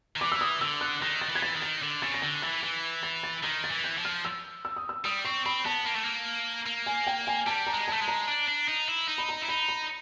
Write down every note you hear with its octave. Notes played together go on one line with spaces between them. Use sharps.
D#3
E3 D6
E6
D#6
D3 E6
F#6
D#3 A#6
A6
E3
G#6
A6
D#3
A6
D3
C#3 A6
A#6
D3 A6
E3 A6
E3 A6
A6
A6
D#3 A#6
A6
E3
G6
F3
F6
E6
E6
D#6
E6
G3 D#6
C4 C#6
C4 B5
B3 A5
A#3
A3
A#3
A#3
G#5
G5
G#5
G3 A5
A#5
G#3
A5
A3
G#3
A#5
D4
D4
D#4
E4
D#4
B5
A#5
E4
D#4 B5
B5